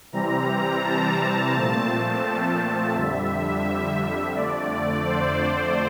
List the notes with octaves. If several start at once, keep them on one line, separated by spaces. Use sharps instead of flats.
C3 E3 G3 C4 A#5
A5
A#2 F3 A3 C4
F2 D3 G3 E5
F2 D3 A3 D5
C5